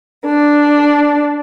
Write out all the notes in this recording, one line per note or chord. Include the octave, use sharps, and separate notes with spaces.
D4